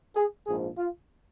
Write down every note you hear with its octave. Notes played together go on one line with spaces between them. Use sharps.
G#4
A#1 G#2 F3 G#4
F4